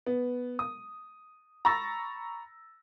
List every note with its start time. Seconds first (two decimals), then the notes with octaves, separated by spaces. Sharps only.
0.06 B3
0.59 D#6
1.65 A#5 B5 C#6 E6 A6 A#6